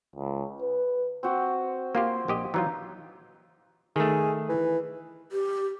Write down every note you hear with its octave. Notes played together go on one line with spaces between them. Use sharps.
C#2
B4
C4 F#4
A#3 F4 G4 C6
A#1 G4 D#5
E3 F#3 D#4 F4
D#3 A3 G#4
E3
G4